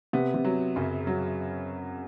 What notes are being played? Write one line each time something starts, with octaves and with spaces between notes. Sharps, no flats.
C3 B3
C3
F#3
F#2 C#3
F#3